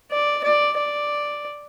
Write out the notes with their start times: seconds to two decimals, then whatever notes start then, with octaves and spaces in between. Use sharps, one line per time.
0.11 D5
0.44 D5
0.77 D5